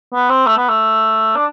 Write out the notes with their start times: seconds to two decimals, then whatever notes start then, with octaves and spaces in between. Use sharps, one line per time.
0.13 B3
0.29 C4
0.46 A3
0.57 B3
0.69 A3
1.36 D4